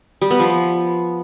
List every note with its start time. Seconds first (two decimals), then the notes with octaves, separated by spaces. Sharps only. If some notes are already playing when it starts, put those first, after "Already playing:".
0.21 G3
0.31 B3
0.40 F3